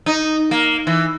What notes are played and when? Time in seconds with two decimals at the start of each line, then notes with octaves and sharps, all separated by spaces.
0.06 D#4
0.51 A#3
0.87 E3